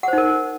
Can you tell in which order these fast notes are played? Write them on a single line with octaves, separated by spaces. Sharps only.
F#5 C5 D#4 A#4